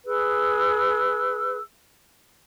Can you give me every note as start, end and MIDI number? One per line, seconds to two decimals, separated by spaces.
0.06 1.59 68
0.06 1.59 71
0.06 1.59 88